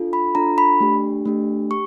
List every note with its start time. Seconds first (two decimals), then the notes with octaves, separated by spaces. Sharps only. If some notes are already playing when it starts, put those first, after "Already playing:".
Already playing: D4 F4 A4
0.13 B5
0.35 D4 F4 A4 A#5
0.58 B5
0.80 A3 D4 G4
1.25 A3 D4 G4
1.71 G4 C#6